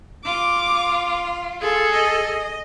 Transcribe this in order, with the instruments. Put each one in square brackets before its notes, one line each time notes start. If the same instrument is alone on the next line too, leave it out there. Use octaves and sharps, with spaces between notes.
[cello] F4 [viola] D6
[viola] G#4 A4
[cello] D#5